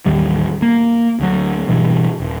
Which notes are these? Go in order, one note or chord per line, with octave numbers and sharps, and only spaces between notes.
A1 D#2 D#3 G3
A#3
D2 F#3
G2 B2 E3
D#1